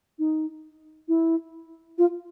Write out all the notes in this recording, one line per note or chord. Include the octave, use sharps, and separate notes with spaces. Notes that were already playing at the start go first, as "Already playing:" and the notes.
D#4
E4
F4